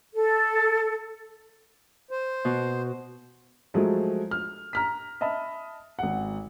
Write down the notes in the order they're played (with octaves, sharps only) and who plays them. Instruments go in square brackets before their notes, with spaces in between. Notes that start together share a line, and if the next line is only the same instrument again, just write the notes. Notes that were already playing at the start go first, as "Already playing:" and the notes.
[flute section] A4
[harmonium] C5
[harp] B2
[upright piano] F3 F#3 G#3 A3
F6
A#5 F6 B6
D#5 E5 A5 B5
G#1 F#5